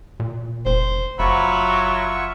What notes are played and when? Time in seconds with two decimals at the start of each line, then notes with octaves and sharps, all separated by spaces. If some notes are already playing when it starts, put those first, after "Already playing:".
0.20 A#2
0.66 F1 C5
1.19 F#1 F#3 F4 E5 B5 C#6